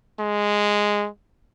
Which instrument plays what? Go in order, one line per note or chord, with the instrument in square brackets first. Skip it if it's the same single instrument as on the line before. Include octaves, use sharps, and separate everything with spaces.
[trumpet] G#3